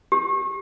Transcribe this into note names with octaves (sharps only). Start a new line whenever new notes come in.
G4